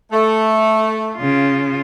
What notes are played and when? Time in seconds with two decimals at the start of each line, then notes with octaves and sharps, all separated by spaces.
0.12 A3
1.17 C#3 F4